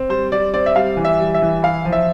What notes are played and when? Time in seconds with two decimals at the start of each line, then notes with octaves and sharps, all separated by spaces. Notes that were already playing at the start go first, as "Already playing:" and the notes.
Already playing: C4
0.09 G3 C5
0.32 G3 D5
0.54 C4 D5
0.66 E5
0.76 G3 F5
0.97 E3
1.05 E5
1.20 G3
1.35 E5
1.42 E3
1.63 E4 F5
1.85 F3
1.92 E5